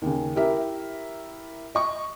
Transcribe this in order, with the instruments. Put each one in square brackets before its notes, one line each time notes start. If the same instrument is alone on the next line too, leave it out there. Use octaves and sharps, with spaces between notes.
[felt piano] D#2 C#3
E4 G4 A#4 E5
D#5 C#6